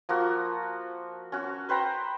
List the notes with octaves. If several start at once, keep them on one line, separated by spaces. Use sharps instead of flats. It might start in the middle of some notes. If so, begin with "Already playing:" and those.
F3 A#3 F#4
C#4 F#4
B4 C5 G5 A#5